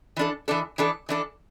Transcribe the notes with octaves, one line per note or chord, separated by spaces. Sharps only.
E3 D4 A4
E3 D4 A4
E3 D4 A4
E3 D4 A4